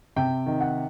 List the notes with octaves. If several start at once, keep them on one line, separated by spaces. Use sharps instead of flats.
C3 G5
D#3
F#5